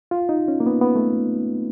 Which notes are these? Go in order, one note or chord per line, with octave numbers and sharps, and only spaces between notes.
F4
D#4
C#4
A#3
B3
B3
A3